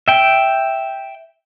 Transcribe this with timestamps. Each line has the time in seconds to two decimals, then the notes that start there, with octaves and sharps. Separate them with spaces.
0.08 E5 G5